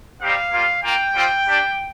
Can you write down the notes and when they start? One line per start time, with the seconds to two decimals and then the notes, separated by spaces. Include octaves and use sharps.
0.20 G3 C4 D#4 G4 F5
0.51 G3 A#3 F4
0.83 A#3 F4 G5
1.15 G3 C4 F4
1.46 G3 D4 G4